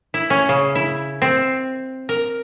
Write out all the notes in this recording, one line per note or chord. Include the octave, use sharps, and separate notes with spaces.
E4
C#4
C#3
E4
C4
A#4